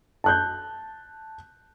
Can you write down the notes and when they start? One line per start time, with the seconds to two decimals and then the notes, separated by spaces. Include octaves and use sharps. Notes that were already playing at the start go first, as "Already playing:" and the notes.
0.24 A5 F#6 G6